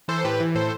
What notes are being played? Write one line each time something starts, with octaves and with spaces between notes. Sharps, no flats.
E3 A4 C5
A2 G4 B4
E3
A2 A4 C5